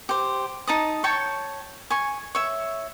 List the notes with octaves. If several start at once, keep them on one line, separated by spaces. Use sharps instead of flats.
G4 C5
D#4 A5 D#6
C#5 G5 A5 C#6
G#5 C#6
C#5 E5